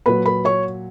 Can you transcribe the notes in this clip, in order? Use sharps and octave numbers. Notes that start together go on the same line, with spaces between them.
A#2 F#3 B4 B5
B4 B5
C#5 C#6